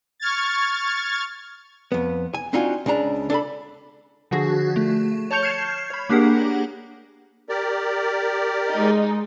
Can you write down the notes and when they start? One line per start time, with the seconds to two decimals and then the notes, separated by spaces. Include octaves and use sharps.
0.20 C#6 F6 G#6 A6
1.92 F2 B3
2.34 G#5
2.53 C4 D4 D#4 F4 F#4 G#5
2.86 C#2 C#3 D4 A#5
3.30 D4 A4 G#5 B5
4.31 D3 F3 F#4 G#4
4.76 A3
5.31 C#5 A5 C#6 G6 C#7 F7
5.43 F6 G6 G#6 C7 E7
5.90 C#5 B5
6.09 A#3 D4 G4 G#4 A#4 F#5
7.49 G4 A#4 D5
8.72 G#3 D#4